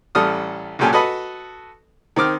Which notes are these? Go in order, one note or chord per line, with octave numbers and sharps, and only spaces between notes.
A1 G3 A4 D#6 F6
C#2 F#2 A#2 G4 A4 G#5
F#4 A4 B4 D#5 A5 B5
D#3 C4 D6 F6